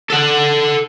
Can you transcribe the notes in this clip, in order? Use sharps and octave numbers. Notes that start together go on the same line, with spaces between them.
A4 F#5